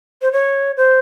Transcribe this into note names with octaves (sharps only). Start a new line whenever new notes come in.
C5
C#5
C5